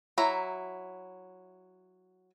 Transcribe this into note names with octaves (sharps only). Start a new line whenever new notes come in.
F#3 E4 E5 A#5